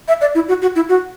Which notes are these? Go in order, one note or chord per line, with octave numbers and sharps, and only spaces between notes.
E5
D5
E4
F#4
F#4
E4
F#4